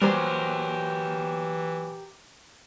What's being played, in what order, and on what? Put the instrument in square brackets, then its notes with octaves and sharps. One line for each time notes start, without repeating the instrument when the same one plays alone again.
[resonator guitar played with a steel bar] A#2 F#3 C5 [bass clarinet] E3 [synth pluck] G3 [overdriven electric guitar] G4 A#4